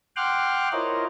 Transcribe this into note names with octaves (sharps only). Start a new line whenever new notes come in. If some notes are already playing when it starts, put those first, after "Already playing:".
F#5 G5 C6 D6 F6 F#6
E4 F4 A#4 C5 C#5 D#5